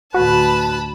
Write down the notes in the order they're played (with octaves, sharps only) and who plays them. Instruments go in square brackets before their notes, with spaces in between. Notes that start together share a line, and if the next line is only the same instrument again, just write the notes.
[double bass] D2 A2 [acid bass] F#4 [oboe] B4 [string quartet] A5 B5